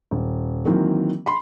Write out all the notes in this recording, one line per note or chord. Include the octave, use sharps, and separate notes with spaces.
D#1
D#3 E3 F#3 A#3 C4
B5 C6